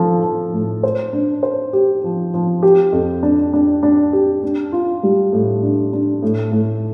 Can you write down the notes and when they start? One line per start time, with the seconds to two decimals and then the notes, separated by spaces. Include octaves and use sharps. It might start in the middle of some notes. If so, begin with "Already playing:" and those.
Already playing: F3 A4
0.23 F3
0.53 A2
0.83 C5
1.13 D4
1.43 C5
1.73 G4
2.04 F3
2.34 F3
2.63 G4
2.92 F2
3.23 D4
3.53 D4
3.83 D4
4.13 G4
4.43 D4
4.72 F4
5.03 G3
5.33 A2
5.63 D4
5.93 D4
6.23 A2
6.52 A2